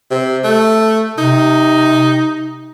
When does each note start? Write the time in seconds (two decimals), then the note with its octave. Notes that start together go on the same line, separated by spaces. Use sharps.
0.11 C3
0.44 A3
1.18 C3 D#4